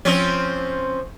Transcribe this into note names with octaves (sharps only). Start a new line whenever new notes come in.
F3 C4 C#4